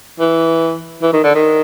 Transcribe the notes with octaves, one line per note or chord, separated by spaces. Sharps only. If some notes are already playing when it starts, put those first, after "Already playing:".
E3
E3
D#3
D3
D#3